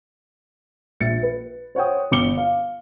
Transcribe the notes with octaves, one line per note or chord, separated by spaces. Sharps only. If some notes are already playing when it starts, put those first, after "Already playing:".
A#1 E5 A6 C#7
B4
C5 C#5 F#5 G5 D#6
G1 D6 C#7 G7
F5